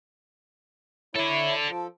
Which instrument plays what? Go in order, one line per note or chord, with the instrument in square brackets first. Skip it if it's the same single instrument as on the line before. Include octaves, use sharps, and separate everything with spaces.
[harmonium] E4 C#5 [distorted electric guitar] A4 D5
[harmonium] F3 A4